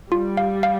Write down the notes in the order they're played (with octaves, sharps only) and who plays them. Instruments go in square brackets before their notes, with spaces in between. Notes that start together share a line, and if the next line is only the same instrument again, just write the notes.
[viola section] G3 [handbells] F4
[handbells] F5
F5